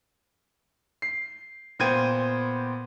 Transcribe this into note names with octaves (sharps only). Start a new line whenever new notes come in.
C7
A#2 B3 C5 G5 G#6 D#7